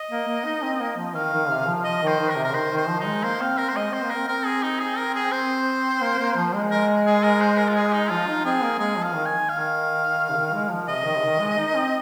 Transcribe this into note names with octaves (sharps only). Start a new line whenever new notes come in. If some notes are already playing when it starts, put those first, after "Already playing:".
Already playing: D#5
A#3
A#3
D#4
C4
A#3
F3
D#3 F5
D#3
C3
F3
F3 D#5
D#3 C5
D#3
A#4
C3
A#4
D#3 C5
D#3
C5
F3
D#4
G#3
A#3 C5
C4 F5
C4 A#4
C5
G#3 D#5
C4 C5
A#3
A#4
C4
C4 A#4
G#4
D#4
G#4
A#4
G#4
C4 C5
A#3
A#3
F3
G#3
A#4
G#4
A#4
C5
A#4
F4
G#4
D#4
F3 F4
D#4
C4 G#4
A#3
G#3 G#4
F3
F5
D#3
G#5
D#3 F5
D#3
C3
D#3
G#3
F3
C3 D#5
D#3
C3
D#3
G#3
D#4
D#4
C4